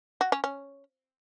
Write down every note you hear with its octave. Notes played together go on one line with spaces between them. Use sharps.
F#4
C#4
C#4